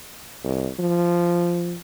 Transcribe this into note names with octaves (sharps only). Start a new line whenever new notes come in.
C2
F3